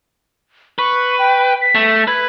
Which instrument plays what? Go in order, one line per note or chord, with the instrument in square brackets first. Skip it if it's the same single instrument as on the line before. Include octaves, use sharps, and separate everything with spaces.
[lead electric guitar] B4 [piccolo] C#6
[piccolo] G5
B6
[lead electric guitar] A3
[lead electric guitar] B4 [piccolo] G#6